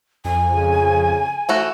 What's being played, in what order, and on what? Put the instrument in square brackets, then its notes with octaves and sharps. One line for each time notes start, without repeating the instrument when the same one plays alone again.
[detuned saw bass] F2 [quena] G#5
[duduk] C#3
[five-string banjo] E3 A3 F#4